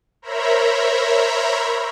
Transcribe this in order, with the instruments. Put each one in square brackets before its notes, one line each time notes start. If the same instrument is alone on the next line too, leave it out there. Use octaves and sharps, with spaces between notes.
[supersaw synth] A#4 C5 C#5 E5 A#5 B5